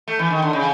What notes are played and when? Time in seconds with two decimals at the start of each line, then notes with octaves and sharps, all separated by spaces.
0.08 A3
0.19 E3
0.30 D#3
0.42 D3
0.53 C#3